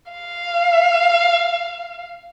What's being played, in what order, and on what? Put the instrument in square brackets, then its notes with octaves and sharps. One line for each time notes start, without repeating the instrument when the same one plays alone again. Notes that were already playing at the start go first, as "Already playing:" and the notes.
[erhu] F5